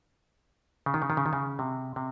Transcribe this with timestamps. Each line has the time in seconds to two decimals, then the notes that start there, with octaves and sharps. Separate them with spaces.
0.86 C#3
0.94 D#3
1.02 C#3
1.10 D#3
1.17 C#3
1.26 D#3
1.33 C#3
1.59 C3
1.96 C3